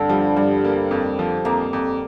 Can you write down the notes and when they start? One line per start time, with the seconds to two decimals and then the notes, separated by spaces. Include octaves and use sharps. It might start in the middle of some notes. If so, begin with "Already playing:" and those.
Already playing: G2 D3 C4
0.09 F3 G3
0.36 G2 G3
0.64 A#3
0.91 F2
1.19 F3
1.45 F2 A#3
1.73 F2